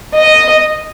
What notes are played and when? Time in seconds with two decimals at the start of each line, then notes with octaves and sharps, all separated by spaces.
0.14 D#5